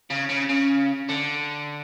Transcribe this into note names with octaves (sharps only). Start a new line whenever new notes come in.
C#3
C#3
C#3
D3